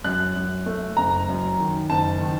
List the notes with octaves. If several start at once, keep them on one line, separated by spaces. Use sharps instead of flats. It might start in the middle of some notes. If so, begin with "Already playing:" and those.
F#2 F#6
F#2
A3
F#1 A#5
F#2
D#3
F#1 A5
D#3